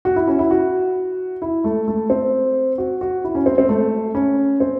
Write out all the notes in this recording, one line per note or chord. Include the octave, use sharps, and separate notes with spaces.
F#4
E4
C#4
E4
F#4
E4
A3
A3
C4
F#4
F#4
E4
C#4
C4
C4
A3
C#4
C4